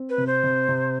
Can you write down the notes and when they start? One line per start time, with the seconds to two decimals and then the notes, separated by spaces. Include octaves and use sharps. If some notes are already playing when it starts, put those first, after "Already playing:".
Already playing: C4
0.10 B4
0.18 C3
0.27 C5
0.43 C3
0.68 C3